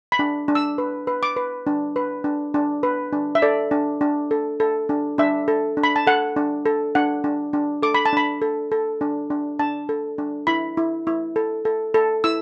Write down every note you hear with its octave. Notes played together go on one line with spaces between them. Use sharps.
B5
D4
D4
E6
B4
B4
D6
B4
D4
B4
D4
D4
B4
D4
E5
A4 D5
D4
D4
A4
A4
D4
D4 E5
A4
D4
B5
A5
A4 F#5
D4
A4
D4 F#5
D4
D4
A4 D6
B5
A5
D4 B5
A4
A4
D4
D4
D4 A5
A4
D4
E4 B5
E4
E4
A4
A4
A4
E4 E6